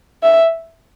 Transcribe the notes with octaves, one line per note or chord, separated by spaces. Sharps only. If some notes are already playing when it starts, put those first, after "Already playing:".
E5